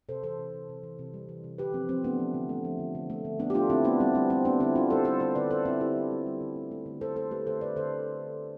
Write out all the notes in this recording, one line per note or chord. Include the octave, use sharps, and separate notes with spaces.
C3 A4 C5
E3 A4 C5
C3
C3
C3
E3
C3
G3
E3
C3
D3 G4 B4
F3 C4
F3 C4
A3 B3 D4
F3
D3
A3
F3
D3
D3
A3
D3
A3 B3 D4
G4
A3 D4 F4
D3 C4 E4
A3 B3 D4
G3 C4
G3 C4
G3 C4
G3 B3 D4
D3 C4 E4
G3 D4 F4
G3 A4 C5
G3 A4 C5
D3 A4 C5
D3 B4 D5
D3 A4 C5
D3 C4 E4
D3 E4 G4
G3
G3
G3
D3
A3
A3
D3
D3 A4 C5
A3 A4 C5
A3 G4 B4
D3 A4 C5
D3 B4 D5
D3 A4 C5